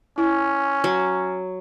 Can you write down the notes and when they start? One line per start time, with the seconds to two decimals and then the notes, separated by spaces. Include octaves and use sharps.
0.18 C#4 E4
0.84 F#3